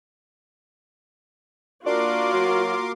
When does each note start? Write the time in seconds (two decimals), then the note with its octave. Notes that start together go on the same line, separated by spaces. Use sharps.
1.86 A#3 D4 F4 F#4 A#4 C6 D6
2.33 F#3